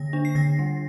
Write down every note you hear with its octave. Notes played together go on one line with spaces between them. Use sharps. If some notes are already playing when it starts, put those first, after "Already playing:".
Already playing: D3 A#3 A#6
D4
C7
D3 A#6
G3